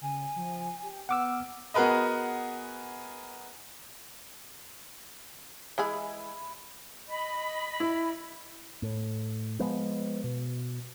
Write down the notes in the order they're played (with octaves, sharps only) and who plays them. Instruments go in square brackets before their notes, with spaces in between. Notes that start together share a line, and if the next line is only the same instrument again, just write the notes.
[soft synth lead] C#3 [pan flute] G#5
[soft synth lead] F3
G4
[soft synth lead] B3 [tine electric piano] F#5 D6 E6 [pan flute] F6
[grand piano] B3 F#4 G#4 A#4 B4 D#5
[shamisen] E3 G#3 G#4 [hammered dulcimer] E4
[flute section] D#5 B5
[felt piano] E4
[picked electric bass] A2
F3 G#3 B3
B2